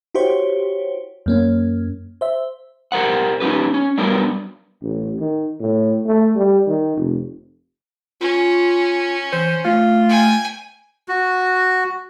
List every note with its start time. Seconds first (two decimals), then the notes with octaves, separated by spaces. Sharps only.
0.15 E4 F#4 G4 C5 C#5
1.26 F#2 A#3 C#4
2.21 C5 E5
2.92 G4 A#4 C5 F#5
3.40 C#4 D#4 F#4 G4 B4
3.74 C#4
3.98 F#3 G3 B3 D4 A#4
4.83 A1
5.20 D#3
5.60 A2
6.07 A3
6.36 G3
6.68 D#3
6.97 F1
8.21 C#4 F4
9.33 E3 C5
9.65 A3 F4
10.09 G5 G#5
11.08 F#4